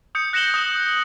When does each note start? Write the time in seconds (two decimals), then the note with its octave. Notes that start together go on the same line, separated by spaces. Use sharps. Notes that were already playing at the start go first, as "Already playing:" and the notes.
0.15 D#6 G6 C#7
0.33 F#6 A#6 C#7 E7 F#7 G7
0.54 D#6 F#6 G7